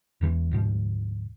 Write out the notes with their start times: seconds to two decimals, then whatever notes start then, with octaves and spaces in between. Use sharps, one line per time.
0.21 E1 E2 D#3 E3
0.51 D2 G#2 B2 F3